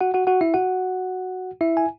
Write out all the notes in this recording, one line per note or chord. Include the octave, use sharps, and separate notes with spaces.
F#4 F#5
F#4 F#5
F#4 F#5
E4 E5
F#4 F#5
E4 E5
G#5